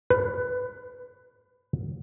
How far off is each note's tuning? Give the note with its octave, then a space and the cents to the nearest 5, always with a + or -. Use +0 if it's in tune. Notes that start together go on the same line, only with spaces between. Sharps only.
B4 +15